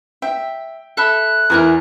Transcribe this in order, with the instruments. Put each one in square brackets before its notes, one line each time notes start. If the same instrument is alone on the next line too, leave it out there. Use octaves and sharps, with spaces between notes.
[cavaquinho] E5 [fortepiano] G5
[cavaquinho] A4 E5 B5 [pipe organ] F#6
[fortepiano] E2 E4 [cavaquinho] A#4 G#5 A#5